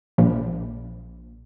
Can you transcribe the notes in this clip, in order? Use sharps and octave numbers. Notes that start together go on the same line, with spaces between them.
A#1